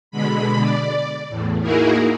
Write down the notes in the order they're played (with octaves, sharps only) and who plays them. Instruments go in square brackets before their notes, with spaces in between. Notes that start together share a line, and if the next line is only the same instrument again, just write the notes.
[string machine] B2 D3 G#3 B5
D5
E2 A2
A#3 D#4 E4 F#4 G#4 A#4